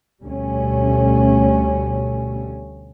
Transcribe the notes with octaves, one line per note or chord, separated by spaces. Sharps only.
D2 B2 G3 A3 C#4